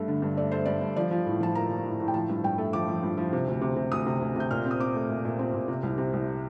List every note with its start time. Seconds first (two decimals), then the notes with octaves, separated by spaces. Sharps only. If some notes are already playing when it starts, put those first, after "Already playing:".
Already playing: G2 A3
0.08 D3
0.22 G2
0.37 A3 D5
0.51 A3 C5
0.65 G2 D5
0.81 G2
0.96 F3 D5
1.11 F3
1.26 A2
1.41 F3 A5
1.55 A#3 A#5
1.70 F3
1.86 A2
2.00 A2
2.08 G5
2.14 F3 A5
2.29 G2
2.44 G2 G5
2.58 A3
2.73 F3 D6
2.88 F3
3.03 G2
3.17 F3
3.33 C3
3.47 D2
3.61 C3
3.76 C3
3.92 D2 D#6
4.06 C3
4.21 D2
4.36 C3 G6
4.51 A#2 F6
4.66 C4
4.71 D#6
4.80 C4 D6
4.95 A3
5.09 A#2
5.25 A#2
5.39 C4
5.54 A#2
5.68 C3
5.83 C2
5.98 C3
6.13 C2